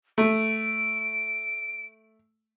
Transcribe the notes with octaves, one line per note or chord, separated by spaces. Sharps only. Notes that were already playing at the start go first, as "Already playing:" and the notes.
A3 D7